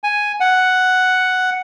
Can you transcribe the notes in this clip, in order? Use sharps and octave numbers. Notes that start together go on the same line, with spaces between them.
G#5
F#5